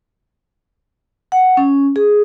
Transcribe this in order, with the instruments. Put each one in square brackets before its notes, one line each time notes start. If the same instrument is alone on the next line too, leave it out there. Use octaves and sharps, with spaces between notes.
[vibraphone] F#5
C#4
G#4